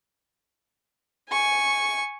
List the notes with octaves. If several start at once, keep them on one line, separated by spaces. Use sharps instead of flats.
G#5 C#6